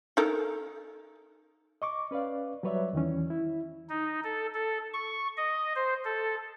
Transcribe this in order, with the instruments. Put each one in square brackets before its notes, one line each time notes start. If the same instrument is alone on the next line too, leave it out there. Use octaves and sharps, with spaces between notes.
[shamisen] D#4 A4 A#4
[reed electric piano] D#5 C#6 D6
C#4 B4 D5 F5
F#3 G3 B4 C#5 D5 E5
E2 D#3 E3 C#4
E4
[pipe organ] D#4
A4
A4
C#6
D#5
C5
A4